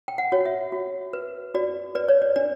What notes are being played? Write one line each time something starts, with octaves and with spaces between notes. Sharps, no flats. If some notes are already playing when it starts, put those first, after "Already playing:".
G5
F#5
F#4 C#5
E5
F#4
B4
F#4 D5
B4 D5
C#5
D5
D4 D5